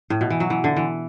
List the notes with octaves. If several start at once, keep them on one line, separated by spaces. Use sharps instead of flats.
A2
B2
E3
F#3
E3
D3
E3